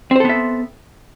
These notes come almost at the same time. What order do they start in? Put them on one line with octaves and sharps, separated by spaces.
C4 C5 A4 B3 E5